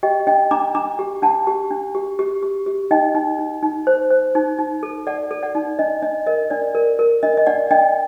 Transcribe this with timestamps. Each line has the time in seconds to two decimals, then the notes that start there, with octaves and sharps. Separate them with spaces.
0.03 G4 D#5 G5
0.27 D4 D#5 G5
0.51 D4 A#5 D6
0.75 D4 A#5 D6
0.99 G4
1.22 D4 F#5 A5
1.47 G4
1.71 D4
1.95 G4
2.19 G4
2.43 G4
2.66 G4
2.91 D#4 D#5 G5
3.15 D#4
3.39 D#4
3.63 D#4
3.87 C5
4.11 C5
4.35 D#4
4.59 D#4
4.83 A4
5.07 A4 D5 F#5
5.31 A4
5.43 D5 F#5
5.55 D#4
5.79 D4 D#5
6.02 D4 D#5
6.26 A#4 D#5
6.50 D4 D5
6.75 A#4
6.99 A#4
7.23 D4 D#5
7.37 D#5
7.47 D4 D5 F#5
7.71 D4 D#5 G5